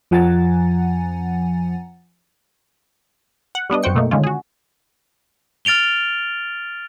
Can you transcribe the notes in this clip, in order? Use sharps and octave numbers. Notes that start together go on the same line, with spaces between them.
F2 F3 F#5 G#5 A#5 A6
F#5
G3 B3 D4 D#5
F#2 F#4 C5 G5 C#7
B2 A3 A#3 D#4
D3 D#3 G#3 C#4 F4
F#4 G#4
F6 A6 D7 F7 G7